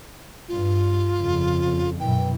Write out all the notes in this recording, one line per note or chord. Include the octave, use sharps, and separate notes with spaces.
G2 F4
F2 C#3
F#2 B2 E3 G5